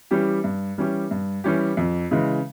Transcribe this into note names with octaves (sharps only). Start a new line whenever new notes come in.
E3 G3 C#4 G4
G2
E3 G3 C#4 G4
G2
E3 G3 C#4 G4
F2
C#3 E3 G#3